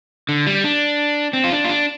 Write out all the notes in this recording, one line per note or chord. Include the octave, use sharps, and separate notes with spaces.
D3
G3
D4
C4
F4
D4
F4
D4